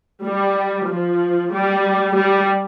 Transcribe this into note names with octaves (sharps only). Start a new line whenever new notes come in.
G3
F3
G3
G3